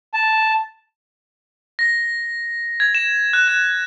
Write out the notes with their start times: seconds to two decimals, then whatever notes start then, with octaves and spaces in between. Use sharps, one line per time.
0.14 A5
1.79 A#6
2.80 G#6
2.95 E7
3.33 F#6
3.48 F#6